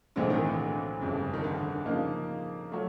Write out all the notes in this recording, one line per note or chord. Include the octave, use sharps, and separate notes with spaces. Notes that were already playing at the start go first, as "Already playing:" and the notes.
B1 A2 D3 E3 G#3 C4
D#3
D3
G1 F2 C#3
D#3
D3
C#3 F3 A#3 D#4
F#3 A3